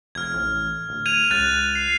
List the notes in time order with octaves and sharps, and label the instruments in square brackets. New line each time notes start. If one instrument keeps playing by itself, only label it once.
[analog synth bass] F1 [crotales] F6 G#6
[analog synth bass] A1
D1
[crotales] G#6 D#7 F7
[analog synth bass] C#2 [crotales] F#6 A6
[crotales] C7